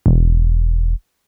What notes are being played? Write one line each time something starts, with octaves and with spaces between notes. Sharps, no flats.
E1